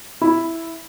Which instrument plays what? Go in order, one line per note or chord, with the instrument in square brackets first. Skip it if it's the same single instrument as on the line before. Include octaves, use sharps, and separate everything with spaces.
[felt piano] E4